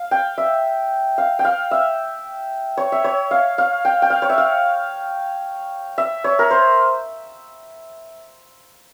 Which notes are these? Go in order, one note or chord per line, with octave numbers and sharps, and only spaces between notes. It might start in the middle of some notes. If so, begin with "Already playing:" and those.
Already playing: F5
G5
E5
F5
G5
F5
E5
C#5
E5
C#5
F5
F5
G5
G5
F5
C#5
E5
F5
E5
C#5
A#4
C5